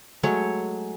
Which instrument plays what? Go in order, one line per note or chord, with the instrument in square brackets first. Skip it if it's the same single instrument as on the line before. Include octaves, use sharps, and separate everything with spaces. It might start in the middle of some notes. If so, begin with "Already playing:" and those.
[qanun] F#3 G#3 A3 C#5